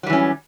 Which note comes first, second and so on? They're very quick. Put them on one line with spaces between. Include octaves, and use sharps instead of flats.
F#3 G3 E3 C#4